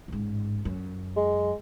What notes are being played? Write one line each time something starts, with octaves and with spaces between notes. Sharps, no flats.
A1 G#2
F#2
G#3